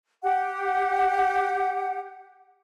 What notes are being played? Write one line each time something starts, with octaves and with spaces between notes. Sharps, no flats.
G4 F#5